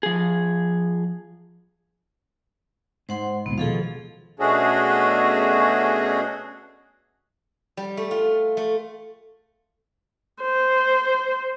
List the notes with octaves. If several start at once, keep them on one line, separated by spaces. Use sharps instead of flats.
F3 G#4
G#2 C5 F#5 C6
A#1 D#2 B2 B3
B2 D#3 F3 G#4 A4 F5
B2 A3 C#4 D4 F#4 G#4
G3
A3
F4
A3
C5